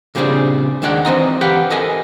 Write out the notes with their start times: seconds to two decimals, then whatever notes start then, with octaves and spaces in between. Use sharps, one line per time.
0.15 A#2 C#3 G3 C4 D4 G#4
0.82 D#2 D#3 G#3 D4 D5 F#5
1.05 E3 C4 D#5 A#5
1.41 G4 B4 F5 F#5
1.70 A4 A#4 D#5 G#5